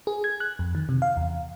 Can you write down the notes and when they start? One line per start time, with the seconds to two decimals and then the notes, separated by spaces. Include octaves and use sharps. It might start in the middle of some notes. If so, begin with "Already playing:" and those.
0.07 G#4
0.24 G#6
0.40 F#6
0.59 F2
0.75 D#3
0.89 C3
1.02 F5
1.17 E2